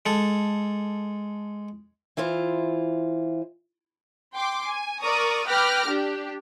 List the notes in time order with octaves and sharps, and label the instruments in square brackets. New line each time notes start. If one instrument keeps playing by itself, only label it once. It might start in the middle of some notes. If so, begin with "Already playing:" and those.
[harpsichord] G#3 A4
[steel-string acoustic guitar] E3 E4 F4 C5
[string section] G5 C6 D6
G#5
A#4 D5 A#5 C#6 D#6
B4 G5 D6 F6 A#6
D4 G4